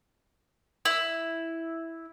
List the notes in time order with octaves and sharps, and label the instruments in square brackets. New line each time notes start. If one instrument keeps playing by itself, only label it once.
[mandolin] E4